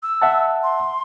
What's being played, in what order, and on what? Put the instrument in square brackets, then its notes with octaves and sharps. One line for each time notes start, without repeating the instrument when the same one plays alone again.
[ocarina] E6
[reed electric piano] E5 F#5 A5
[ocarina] C6